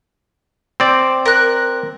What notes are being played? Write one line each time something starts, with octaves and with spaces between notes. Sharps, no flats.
C4 D5
A#4 F#6